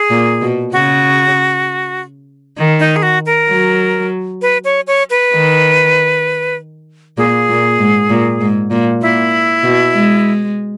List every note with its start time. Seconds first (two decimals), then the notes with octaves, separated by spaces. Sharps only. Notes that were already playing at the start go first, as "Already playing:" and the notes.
Already playing: G#4
0.10 A#2
0.42 B2
0.72 C#3 F#4
2.57 D#3
2.80 D#4
2.96 G#4
3.03 F#4
3.26 A#4
3.49 F#3
4.42 B4
4.65 C#5
4.87 C#5
5.10 B4
5.33 D#3
7.17 A#2 G#4
7.48 A#2
7.79 G#2
8.09 A#2
8.40 G#2
8.71 A#2
9.02 A#2 E4
9.63 B2
9.94 G#3